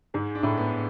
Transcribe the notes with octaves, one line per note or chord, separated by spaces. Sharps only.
G#2 G#3
D4
A2
B3